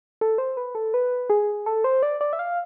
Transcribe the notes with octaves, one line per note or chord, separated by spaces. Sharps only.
A4
C5
B4
A4
B4
G#4
A4
C5
D5
D5
E5
F5